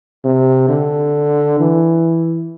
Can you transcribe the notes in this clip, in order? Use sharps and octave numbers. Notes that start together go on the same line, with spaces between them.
C3
D3
E3